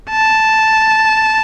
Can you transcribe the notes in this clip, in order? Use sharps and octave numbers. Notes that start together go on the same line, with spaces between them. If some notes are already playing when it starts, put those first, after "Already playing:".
A5